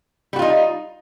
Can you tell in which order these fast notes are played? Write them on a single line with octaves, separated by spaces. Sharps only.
G3 F#4 F4 D#4